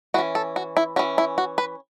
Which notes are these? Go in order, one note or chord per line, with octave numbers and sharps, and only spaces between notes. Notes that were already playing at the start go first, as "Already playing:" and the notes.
E3 C#4 F#4
A4
F#4
E4
E3 C#4 F#4
E4
F#4
B4